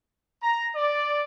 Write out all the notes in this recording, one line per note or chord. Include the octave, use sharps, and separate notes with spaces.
A#5
D5